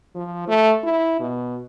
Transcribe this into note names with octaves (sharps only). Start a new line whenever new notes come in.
F3
A3
E4
B2